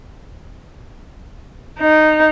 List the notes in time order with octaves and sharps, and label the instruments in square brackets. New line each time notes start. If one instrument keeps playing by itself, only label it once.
[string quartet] D#4